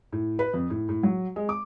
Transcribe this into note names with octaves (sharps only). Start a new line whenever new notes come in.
A2
B4
F2
A2
A2
F#3
G#3
D6